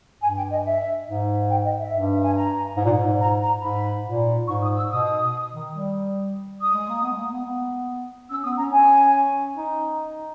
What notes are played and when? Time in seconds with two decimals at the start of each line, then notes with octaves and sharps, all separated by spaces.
0.21 G2 G#5
0.36 G5
0.51 D#5
0.65 E5
1.06 G#2
1.49 G5
1.64 D#5
1.79 E5
1.93 G2
2.22 G#5
2.34 A#5
2.77 G#2
2.85 A#2
2.92 G#2
3.20 A#5
3.41 A#5
3.62 G#2 B5
4.05 A#2
4.47 G#2 C#6
4.61 D#6
4.75 E6
4.90 B2 D#6
5.54 D#3
5.74 G3
6.60 D#6
6.74 G#3
6.89 A#3
7.03 B3
7.11 G#3
7.17 A#3
7.31 B3
7.45 B3
8.30 C#4 E6
8.44 B3 D#6
8.58 C#4 A#5
8.72 C#4 G#5
9.57 D#4